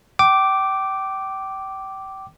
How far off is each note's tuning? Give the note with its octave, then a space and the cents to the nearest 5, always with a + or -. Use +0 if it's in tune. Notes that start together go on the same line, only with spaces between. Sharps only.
G5 -30 D6 +0